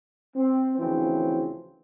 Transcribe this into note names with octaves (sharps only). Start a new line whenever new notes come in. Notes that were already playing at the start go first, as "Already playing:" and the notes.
C4
D2 C#3 E3 F3 C4 C#4